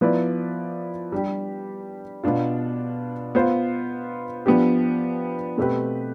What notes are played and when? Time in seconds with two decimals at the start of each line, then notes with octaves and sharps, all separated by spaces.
0.01 F3 B3 E4 B4 D5
1.12 G3 D4 G4
2.24 B2 B3 D4 F4
3.35 B3 F4 C5
4.46 F3 B3 D4 G4
5.58 B2 A3 C4 G4 B4